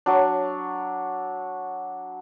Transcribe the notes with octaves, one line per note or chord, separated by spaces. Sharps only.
F#3 D4